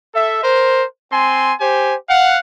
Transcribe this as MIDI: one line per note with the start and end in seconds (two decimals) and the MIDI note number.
0.15 0.39 69
0.15 0.39 76
0.44 0.85 70
0.44 0.85 72
1.12 1.53 60
1.12 1.53 80
1.12 1.53 84
1.60 1.95 67
1.60 1.95 72
1.60 1.95 80
2.09 2.38 77
2.09 2.38 78